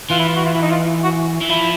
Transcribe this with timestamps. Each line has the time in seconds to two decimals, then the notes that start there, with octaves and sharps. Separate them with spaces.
0.10 E3 F4
0.19 E4
0.28 F4
0.36 F#4
0.45 F4
0.54 E4
0.62 D#4
0.71 F4
1.04 F#4
1.41 E3
1.49 F3 E4